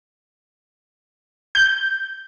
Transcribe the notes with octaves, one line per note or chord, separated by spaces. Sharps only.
G6